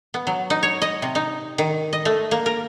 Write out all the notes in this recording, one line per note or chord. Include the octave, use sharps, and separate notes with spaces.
B3
F#3
D#4
C#5
D#5
C3
D#4
D#3
D#5
A3
A#3
A#4